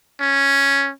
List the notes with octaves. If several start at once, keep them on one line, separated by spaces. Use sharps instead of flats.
C#4